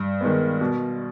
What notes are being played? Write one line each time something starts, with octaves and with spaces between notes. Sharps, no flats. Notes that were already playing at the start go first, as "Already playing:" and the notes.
Already playing: G2
D#3 G#3 B3
B2